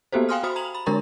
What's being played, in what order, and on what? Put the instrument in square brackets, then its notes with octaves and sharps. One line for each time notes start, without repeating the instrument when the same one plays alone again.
[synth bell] A#3 B3 F#4 G4 A4 C5
F5 G5 G#5 C6 D#6 F6
F#4 C5 B5 D#6
A#5 F7 F#7
B5
D3 G#3 D4 A#4 A#5 C6